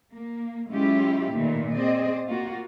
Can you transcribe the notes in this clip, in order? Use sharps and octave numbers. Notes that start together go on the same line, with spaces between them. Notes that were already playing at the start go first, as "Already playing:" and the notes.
A#3
F#3 G#3 C#4 E4 F4 G4
A#2 D#3 E3 A3 A#3
C4 G#4 C5 D5 D#5
A#3 F4 F#4